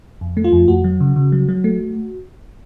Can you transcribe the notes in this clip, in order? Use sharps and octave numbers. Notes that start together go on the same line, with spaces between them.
F2
A3
F4
F2
F2 F#4
F#3
C#3
C#3
F#3
F#3
A3